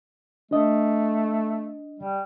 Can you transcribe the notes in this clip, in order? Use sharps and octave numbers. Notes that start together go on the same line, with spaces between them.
A3 D4 D#5
G3